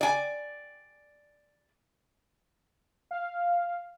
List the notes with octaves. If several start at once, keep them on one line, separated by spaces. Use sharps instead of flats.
D5 G#5
F5